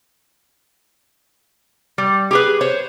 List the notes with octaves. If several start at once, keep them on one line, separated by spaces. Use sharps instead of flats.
G3
G4 G#4 B4
C5 C#5